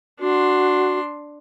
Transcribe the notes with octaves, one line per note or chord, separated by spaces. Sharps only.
D4 F#4 C6